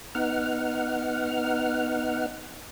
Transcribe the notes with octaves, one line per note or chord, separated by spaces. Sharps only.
B3 D#4 F#5 F6